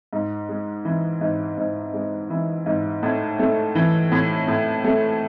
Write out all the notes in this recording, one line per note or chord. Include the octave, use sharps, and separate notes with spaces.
G#2
G#3
E3
G#2
G#2
G#3
E3
G#2
A2
A3
E3
A2
A2
A3